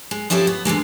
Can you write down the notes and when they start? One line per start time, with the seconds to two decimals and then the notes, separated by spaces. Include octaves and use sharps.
0.11 G#3
0.30 F3 C#4 E4 G4 A4
0.47 B3
0.65 D3 E3 G#3 A#3